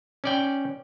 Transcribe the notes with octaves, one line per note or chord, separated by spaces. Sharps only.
C#4 D5 G5